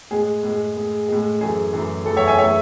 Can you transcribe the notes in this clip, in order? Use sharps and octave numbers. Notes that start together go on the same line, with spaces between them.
A2 G#3 G#4
A2 G#3
A2 G#3
A2 G#3
F#2 E3 A3 G#4
F#2 E3 A3
F#2 E3 A3 A4
C#5 E5
E5 G#5
E3 A3 C#5 E5